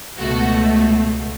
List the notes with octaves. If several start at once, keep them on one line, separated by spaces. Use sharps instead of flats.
C#2 B2 A3 F#4